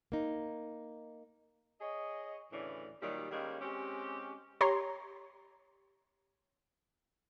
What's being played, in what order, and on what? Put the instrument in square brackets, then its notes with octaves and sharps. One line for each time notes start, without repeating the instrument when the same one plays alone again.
[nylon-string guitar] A#3 D#4
[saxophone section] G#4 C#5 D#5
D2 A2 C#3 E3 D5
A#2 D#3 F#3 G3
D#3 G3 G#3 A#3 C#4
G#3 C4 C#4 G4
[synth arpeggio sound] G4 C#5 A#5 C6